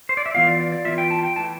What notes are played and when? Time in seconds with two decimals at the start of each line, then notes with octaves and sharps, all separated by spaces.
0.09 C5
0.17 D5
0.26 E5
0.34 E3 B3 F4 F5
0.47 D5
0.59 D5
0.72 D5
0.85 E3 B3 F4 E5
0.98 G5
1.11 A5
1.23 G5
1.36 E3 A3 A5